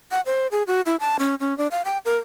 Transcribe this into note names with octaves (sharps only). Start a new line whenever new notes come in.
F#5
C5
G#4
F#4
E4
A5
C#4
C#4
D4
F5
G5
A#4